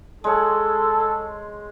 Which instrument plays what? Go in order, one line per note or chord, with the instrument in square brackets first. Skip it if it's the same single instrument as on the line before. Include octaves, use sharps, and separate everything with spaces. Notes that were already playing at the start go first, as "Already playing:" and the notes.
[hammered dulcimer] G#3 C#5 [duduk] A4